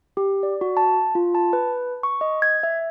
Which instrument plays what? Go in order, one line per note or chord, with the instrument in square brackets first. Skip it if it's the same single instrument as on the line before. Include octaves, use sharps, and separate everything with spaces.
[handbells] G4
D5
F#4
A5
F4
A5
B4
C#6
D#5
G#6
E5